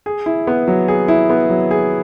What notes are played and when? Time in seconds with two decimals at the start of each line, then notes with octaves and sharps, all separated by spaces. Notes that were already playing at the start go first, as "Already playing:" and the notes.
0.06 G#4
0.26 E4
0.47 B3
0.68 F#3
0.88 G#4
1.08 E4
1.30 B3
1.50 F#3
1.71 G#4